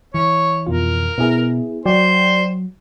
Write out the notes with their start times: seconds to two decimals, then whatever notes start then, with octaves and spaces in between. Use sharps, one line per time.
0.14 E3 C#5
0.67 F2 B2 F4 A#4
1.18 B2 B3 E4 G#4
1.85 F#3 F#4 C5 D5 G5